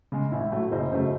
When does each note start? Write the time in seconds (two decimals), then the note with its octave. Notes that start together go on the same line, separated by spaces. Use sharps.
0.12 C#3 G#3
0.32 A1 E4
0.52 A2 F#3 A3
0.71 F#1 C5 D#5
0.92 F#2 C#3 F#3 A3 C5 D#5